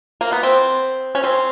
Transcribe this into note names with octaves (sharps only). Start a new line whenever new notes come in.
A#3
B3
C4
C#4
C4